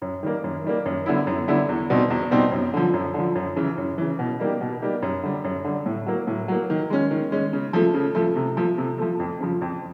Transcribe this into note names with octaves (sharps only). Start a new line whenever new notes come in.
F#2
D#3 G3 A#3
F#2
D#3 G3 A#3
F#2
D3 G3 B3 E4
F#2
D3 G3 B3 E4
E2
B2 G3 C4 D#4
E2
B2 G3 C4 D#4
F#2
D3 F3
F#2
D3 F3
F#2
C#3 E3
F#2
C#3 E3
B2
G3 A#3 D#4 G4
B2
G3 A#3 D#4 G4
F#2
D3 G3
F#2
D3 G3
A2
F#3 A#3
A2
F#3 A#3
D#3
G#3 C#4
D#3
G#3 C#4
C#3
F3 A3
C#3
F3 A3
C3
F3 A3
C3
F3 A3
F2
C#3 F3
F2